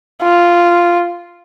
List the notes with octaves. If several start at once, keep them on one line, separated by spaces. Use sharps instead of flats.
F4